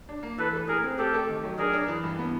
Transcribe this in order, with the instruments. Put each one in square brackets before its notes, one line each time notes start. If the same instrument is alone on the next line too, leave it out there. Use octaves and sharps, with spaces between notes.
[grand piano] D4
A#3
[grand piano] E3 [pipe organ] A4 B4
[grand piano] A3
[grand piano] A3 [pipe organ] G#4 A#4
[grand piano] C4
[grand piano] A3 [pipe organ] G4 A4
[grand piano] A3
D#3
F#3
[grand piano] D4 [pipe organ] G#4 A#4
[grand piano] D4
E3
G2
B3